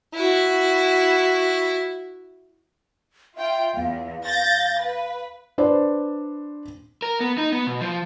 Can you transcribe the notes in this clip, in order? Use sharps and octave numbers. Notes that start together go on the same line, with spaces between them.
E4 F#4
F4 E5 G5
E2 F5
G6 A6 A#6
B4
D4 B4 C5 D5
A#4
B3
D#4
B3
B2
F3